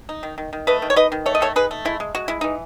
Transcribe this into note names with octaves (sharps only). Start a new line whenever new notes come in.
D#4
D#3
D#3
D#3
A3 B4 D#5
D#3
C#5
D#4 B4 D#5
D#3
A3 C#5
D#5
D#3 A4 C#5
D#4 G#4 B4
A3
G#3 E4
G#3
G#3 F#4
G#3 E4
E3 D#4